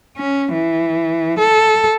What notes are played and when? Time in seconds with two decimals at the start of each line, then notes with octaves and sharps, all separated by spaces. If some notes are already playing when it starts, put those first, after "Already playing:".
0.17 C#4
0.53 E3
1.38 A4